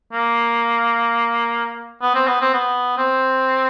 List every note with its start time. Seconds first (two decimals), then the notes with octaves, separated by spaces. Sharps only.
0.13 A#3
2.02 B3
2.15 C4
2.27 B3
2.41 C4
2.54 B3
2.98 C4